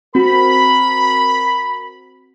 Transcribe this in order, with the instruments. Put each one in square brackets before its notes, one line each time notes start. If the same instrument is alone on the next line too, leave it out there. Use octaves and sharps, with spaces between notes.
[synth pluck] C4 F#4 [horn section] A#4 B5